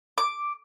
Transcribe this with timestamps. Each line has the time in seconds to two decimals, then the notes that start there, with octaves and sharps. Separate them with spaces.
0.18 D6